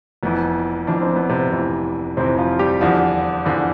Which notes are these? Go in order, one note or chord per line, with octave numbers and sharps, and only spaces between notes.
F1 F2 E3 B3
F1 F2 E3 D4
C4
B3
C3 C4
F1 F2 E3
F1 F2 C3 E3 C4
F3 F4
G3 G4
E2 D3 F3
E2 D3 F3